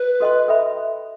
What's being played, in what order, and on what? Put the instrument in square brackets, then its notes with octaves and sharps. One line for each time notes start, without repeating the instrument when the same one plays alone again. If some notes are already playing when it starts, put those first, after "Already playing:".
Already playing: [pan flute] B4
[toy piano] F#4 A4 D#5 G5 C6
A4 E5 G5 B5